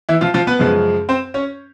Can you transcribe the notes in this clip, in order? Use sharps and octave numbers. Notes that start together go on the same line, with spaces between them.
E3 E4
F3 F4
F3 F4
B3 B4
F#2 C#3 F3 G#3
C4 C5
C#4 C#5